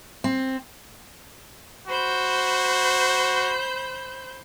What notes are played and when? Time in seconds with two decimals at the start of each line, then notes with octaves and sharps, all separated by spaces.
0.24 C4
1.87 F#4 C5 B5 G6